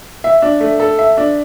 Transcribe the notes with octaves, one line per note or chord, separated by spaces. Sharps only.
E5
D4
A3
A4
E5
D4